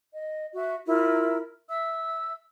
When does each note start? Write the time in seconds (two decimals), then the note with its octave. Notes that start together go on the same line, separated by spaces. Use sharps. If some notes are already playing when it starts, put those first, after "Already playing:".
0.12 D#5
0.54 F#4 E5
0.87 E4 F4 A#4
1.69 E5 E6